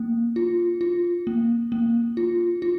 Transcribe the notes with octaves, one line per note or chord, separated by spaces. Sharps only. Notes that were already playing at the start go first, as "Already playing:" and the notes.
Already playing: A#3
F4
F4
A#3
A#3
F4
F4